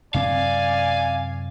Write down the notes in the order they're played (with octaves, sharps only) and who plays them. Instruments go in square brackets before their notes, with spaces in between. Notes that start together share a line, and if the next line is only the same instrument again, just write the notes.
[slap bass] F#2 C3 C4 [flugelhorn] D5 [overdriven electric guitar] F5 [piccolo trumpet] G#5